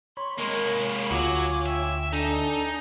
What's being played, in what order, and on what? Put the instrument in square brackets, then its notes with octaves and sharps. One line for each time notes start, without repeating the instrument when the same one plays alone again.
[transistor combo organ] C#5 B5 [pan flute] C6
[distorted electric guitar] G#3 A#3 [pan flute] A#4
[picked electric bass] D2 [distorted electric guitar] F#3 [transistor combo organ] F4 C#5 G#5 [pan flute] D6
[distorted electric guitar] E5 [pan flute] G5
[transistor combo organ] D4 A4 [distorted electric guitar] D#4 [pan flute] G#5